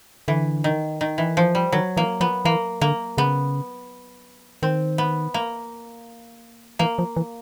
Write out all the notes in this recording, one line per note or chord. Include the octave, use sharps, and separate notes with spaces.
D3 E3
D#3
D#3
E3
F3
G3
D#3 F#3
E3 A#3
F3 B3
E3 A#3
D3 A#3
C#3 B3
D#3 C4
B3
A#3
E3 A#3
F3
E3